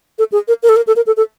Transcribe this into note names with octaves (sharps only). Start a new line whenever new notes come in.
A4
G#4
A#4
A#4
A4
A#4
A4
A#4
A4
A4